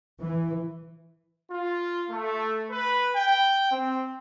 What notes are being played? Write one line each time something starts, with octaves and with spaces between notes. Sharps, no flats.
E3
F4
A3
B4
G5
C4